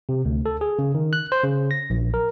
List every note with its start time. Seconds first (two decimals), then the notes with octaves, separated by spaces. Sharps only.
0.09 C3
0.25 D2
0.46 A4
0.61 G#4
0.79 C#3
0.95 D#3
1.13 F#6
1.32 C5
1.44 C#3
1.71 A#6
1.90 A#1
2.14 A#4